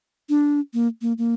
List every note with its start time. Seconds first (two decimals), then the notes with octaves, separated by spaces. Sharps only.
0.29 D4
0.74 A#3
1.02 A#3
1.18 A#3